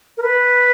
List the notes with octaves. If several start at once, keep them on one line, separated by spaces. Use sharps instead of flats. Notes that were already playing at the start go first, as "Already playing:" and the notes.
A#4
B4